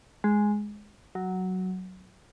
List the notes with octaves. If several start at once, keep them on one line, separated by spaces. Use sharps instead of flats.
G#3
F#3